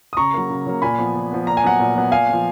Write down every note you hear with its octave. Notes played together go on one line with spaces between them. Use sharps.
D#6
C#3 A#5 C#6
F#3 A#3
C#3
F#3 A#3
A#2 G#5 B5
F3 B3
A#2
F3 B3
A#2 A#5
G#5
F#3 B3 F#5 A#5
A#2
F#3 B3
A#2 F5 G#5
F3 B3